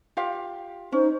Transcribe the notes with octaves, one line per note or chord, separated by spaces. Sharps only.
F4 G4 F5
C#4 D#4 C5